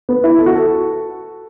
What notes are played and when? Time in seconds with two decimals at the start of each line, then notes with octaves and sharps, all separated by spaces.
0.09 B3
0.24 E4
0.39 A4
0.46 F#4
0.55 A4